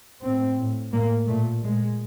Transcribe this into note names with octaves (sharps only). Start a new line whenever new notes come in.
A2 C4
A2
A2 A#3
A#2 A3
A#2 G#3